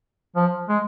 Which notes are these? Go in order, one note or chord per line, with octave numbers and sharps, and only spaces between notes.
F3
G#3